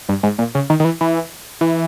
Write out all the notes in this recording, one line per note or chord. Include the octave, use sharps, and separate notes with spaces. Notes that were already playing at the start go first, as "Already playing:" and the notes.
G2
G#2
A#2
C#3
D#3
D#3
E3
E3
E3